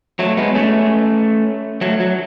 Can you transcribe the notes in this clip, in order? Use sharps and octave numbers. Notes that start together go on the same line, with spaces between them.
F#3 A3
G#3 B3
A3 C#4
F#3 A3
F#3